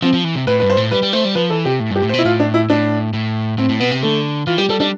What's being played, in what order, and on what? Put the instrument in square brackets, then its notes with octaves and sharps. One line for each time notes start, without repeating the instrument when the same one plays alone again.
[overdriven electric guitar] F3 [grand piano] C4
[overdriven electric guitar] F3
E3
C3
[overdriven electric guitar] A2 [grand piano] B4
[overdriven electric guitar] G2 [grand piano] B4
[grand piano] C5
[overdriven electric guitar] A2
[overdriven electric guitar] G3 [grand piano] B4
[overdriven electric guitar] G3
[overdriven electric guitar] A3 [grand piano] C5
[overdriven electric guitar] G3
[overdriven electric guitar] F3 [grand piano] B4
[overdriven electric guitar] E3 [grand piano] A4
[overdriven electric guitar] C3 [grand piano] G4
[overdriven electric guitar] A2
[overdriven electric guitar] G2 [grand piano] G4
[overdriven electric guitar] A2
[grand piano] C5
[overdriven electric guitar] B2
[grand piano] E4
[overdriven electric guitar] A2 [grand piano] F4
[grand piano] D4
E4
[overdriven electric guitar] A2 [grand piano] D4
[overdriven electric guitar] A2
[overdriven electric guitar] A2 [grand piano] C4
[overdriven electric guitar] A2
[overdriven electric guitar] B2 [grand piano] B3
[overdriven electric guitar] C3
[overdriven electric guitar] D3 [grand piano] A3
[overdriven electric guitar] E3 [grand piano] F4
[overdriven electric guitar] G3 [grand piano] G4
[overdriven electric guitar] G3 [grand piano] A4
[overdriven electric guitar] G3 [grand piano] D4